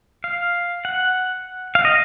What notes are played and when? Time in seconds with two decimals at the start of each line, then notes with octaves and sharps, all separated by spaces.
0.24 F5
0.85 F#5
1.75 F5
1.85 D#5